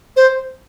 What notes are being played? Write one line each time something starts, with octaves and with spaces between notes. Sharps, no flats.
C5